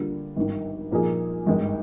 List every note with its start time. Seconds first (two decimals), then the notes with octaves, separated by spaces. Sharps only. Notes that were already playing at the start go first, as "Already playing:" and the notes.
Already playing: D3 G3 A#3 F4
0.36 G#1 G2 D#3
0.91 A#2 F3 A#3 D#4 G#4
1.46 G#1 G2 D#3 G#3